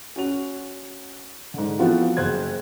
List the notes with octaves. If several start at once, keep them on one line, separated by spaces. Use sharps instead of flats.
C#4 F#4 F7
G#2 D3
E3 F3 B3 C4 F4 F#4
F#1 C5 F#6 G#6